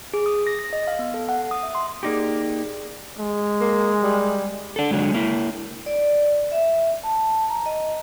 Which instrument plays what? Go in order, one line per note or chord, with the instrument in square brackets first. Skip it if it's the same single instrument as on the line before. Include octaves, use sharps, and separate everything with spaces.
[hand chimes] G#4
D#6
A#6
A#6
D#5
F5
B3
A4
F#5
D#6
E5
C6
[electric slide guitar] A#3 D#4 G4 [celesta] G#4 D5 D6
[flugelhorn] G#3
[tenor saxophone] A#3
G3
[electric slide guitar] D4 A4
D3 F#3 G#3
A#3 E4
[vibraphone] D5
E5
A5
A#5
D#5